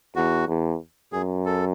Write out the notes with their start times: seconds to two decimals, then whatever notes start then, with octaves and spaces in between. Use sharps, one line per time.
0.16 E2 F#4
0.48 E2
1.12 F#2 G#4
1.45 A4